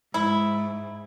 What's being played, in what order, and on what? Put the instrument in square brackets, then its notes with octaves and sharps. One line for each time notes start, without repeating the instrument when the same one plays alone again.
[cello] G#2 [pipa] E4